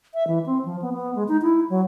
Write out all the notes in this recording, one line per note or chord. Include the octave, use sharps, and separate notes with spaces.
E5
E3
C4
F3
B3
B3
G#3
D#4
E4
F#3